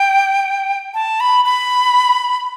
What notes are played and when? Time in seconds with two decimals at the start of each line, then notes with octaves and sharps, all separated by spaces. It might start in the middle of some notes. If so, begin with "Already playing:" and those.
Already playing: G5
0.94 A5
1.20 B5
1.45 B5